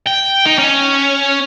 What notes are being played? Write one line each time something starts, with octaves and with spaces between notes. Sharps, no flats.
G5
D#4
C#4